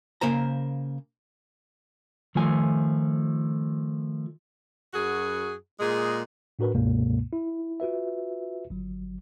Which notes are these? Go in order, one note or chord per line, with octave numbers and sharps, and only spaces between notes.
C#3 A#3 A#4 C5 A#5
D#3 F3 A3 G#5
F#2 F#4 G#4
A#2 G#3 G#4
A2 D4 F#4 A#4 B4
C#2 G2 B2 G#3 A#3
E4
F4 F#4 B4 E5
G1 F#3